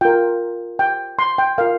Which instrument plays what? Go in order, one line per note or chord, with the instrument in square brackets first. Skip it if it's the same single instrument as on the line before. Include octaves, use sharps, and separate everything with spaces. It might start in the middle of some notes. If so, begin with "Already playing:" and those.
[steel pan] F4 A#4 G5
G5
C6
G5
F4 A#4 F5